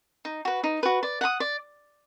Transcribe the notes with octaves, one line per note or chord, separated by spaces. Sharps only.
D#4
F#4 B4
D#4
F#4 B4
D5
F#5 A#5 D#6
D5